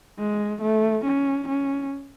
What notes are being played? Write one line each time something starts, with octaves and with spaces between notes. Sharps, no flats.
G#3
A3
C#4
C#4